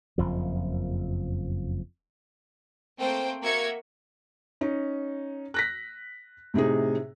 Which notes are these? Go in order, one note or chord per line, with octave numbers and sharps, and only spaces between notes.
F#1 F2 F3
A3 A#3 C4 C5 G5
A#3 F#4 A#4 E5 G#6 C#7
C#4 D#4
F#6 A#6 B6
A2 C3 D#4 G#4